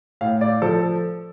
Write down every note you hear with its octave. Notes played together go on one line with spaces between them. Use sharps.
A2 F5
D5
F3 A4